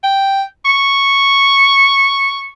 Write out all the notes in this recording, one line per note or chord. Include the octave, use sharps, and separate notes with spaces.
G5
C#6